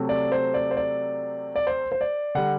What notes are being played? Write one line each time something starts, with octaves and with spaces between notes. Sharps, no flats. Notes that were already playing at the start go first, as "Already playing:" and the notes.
Already playing: C3 F#3 A3
D5
C5
D5
C5
D5
D5
C5
C5
D5
D3 G3 F#5